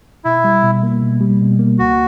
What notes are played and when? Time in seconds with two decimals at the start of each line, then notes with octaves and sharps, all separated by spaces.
0.25 B2 E4
0.44 G3
0.64 B2
0.83 A#3
1.02 B2
1.21 G3
1.41 B2
1.59 A#3
1.79 C#2 F#4